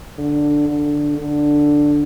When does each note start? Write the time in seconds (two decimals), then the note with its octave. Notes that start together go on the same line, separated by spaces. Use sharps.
0.18 D3
0.68 D3
1.18 D3